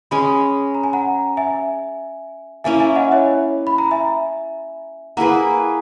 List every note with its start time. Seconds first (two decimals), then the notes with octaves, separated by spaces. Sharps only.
0.11 G#3 C#4 G#4 G#5 B5
0.75 A#5
0.84 G#5
0.93 F#5 A#5
1.37 E5 G#5
2.64 A#3 C#4 E4 E5 G#5
2.80 E5 G#5
2.96 D#5 F#5
3.12 C#5 E5
3.67 B5
3.78 A#5
3.91 E5 G#5
5.17 A#3 E4 G#4 B4 F#5 A#5